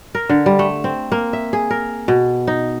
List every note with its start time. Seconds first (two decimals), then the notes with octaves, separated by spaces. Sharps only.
0.15 A#4
0.29 D3
0.46 G3
0.59 A3
0.84 C4
1.12 A#3
1.33 E5
1.53 G#4
1.70 A#4
2.08 B2
2.47 D#4